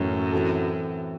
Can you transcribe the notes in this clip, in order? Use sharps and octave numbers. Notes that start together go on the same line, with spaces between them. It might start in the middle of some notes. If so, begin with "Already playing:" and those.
Already playing: F#2 A2 E3 A3 C#4
E3 C4 F#4 A4